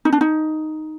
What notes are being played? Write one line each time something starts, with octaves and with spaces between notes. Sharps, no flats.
D#4
D4
D#4